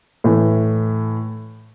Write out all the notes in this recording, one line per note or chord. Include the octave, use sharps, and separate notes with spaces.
A2 E3